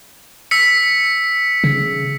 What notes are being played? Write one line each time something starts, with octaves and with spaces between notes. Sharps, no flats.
E6 B6 C#7
C#3